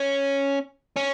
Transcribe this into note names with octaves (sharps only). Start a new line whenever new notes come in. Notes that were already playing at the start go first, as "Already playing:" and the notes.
Already playing: C#4
C#4